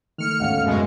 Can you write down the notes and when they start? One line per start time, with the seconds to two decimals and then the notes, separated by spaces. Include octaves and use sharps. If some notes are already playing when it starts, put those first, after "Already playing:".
0.18 D#3 A3 F6 C#7
0.40 D2 G#2 A3 C#4 F5 F#5
0.63 F#2 B2 G#3